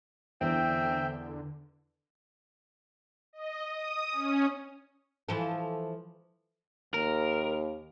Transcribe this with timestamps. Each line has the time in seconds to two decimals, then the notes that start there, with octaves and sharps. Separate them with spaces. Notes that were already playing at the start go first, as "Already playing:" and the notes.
0.41 E2 D3 C4 E5 G5
3.33 D#5
3.64 D#6
4.11 C#4
5.28 E3 F3 A4
6.94 D#2 A#4